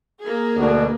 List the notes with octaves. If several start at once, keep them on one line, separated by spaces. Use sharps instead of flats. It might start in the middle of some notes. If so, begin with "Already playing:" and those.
A#3 G#4
D2 B2 D4